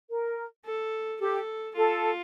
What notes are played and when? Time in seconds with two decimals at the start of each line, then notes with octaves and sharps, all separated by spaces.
0.10 A#4
0.66 A4
1.21 G4 A4
1.76 F4 A4